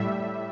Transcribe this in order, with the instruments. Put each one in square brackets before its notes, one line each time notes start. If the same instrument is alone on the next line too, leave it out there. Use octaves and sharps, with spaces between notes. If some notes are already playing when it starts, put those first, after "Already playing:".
Already playing: [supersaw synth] A2 G3 E5